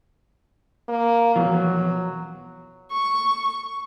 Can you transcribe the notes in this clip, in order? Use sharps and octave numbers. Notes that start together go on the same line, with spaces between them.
A#3
E2 B2 F3 F#3
C#6